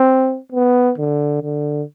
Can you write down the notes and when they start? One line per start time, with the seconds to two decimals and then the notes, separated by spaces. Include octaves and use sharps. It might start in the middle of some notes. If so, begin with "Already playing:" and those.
Already playing: C4
0.52 B3
0.98 D3
1.42 D3